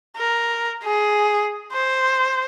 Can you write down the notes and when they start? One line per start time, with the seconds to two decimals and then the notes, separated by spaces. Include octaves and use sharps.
0.17 A#4
0.84 G#4
1.73 C5